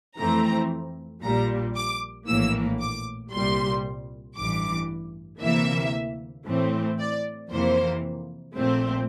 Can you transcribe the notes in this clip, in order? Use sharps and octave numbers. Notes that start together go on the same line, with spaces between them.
F2 E3 A3 C4 A#5
A#1 A#2 G3 A#5
D6
A#1 A2 E3 A#3 E6
D6
C2 A#2 G3 C6
A1 G2 E3 D6
D2 C3 E3 A#3 E5
A2 E3 A3 C4
D5
F2 C3 E3 A#3 C5
A#1 A#2 A3 C4 C5